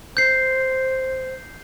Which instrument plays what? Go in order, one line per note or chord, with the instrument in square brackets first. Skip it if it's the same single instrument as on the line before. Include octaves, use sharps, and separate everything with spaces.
[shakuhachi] C5 [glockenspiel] G6 C7